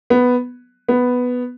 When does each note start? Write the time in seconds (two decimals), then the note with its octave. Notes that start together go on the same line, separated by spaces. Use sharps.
0.10 B3
0.88 B3